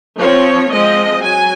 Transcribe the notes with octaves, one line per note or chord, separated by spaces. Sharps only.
F3 C4 C#5
F3 G#3 C4 D#5
F#3 G#5